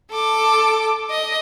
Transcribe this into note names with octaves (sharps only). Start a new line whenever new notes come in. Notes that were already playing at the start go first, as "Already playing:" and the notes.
A4 D6
D#5